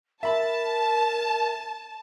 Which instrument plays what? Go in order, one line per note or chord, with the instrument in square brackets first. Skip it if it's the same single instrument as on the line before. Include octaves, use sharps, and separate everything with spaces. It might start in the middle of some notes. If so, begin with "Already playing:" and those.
[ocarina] A#4 [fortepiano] E5 B5 [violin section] A5